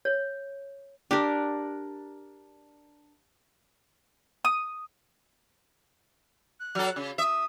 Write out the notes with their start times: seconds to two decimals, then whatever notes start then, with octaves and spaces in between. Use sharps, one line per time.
0.05 C#5
1.11 D4 G4 A#4
4.45 D#6
6.60 F#6
6.75 F#3 A4
6.96 C#3
7.18 E5 D#6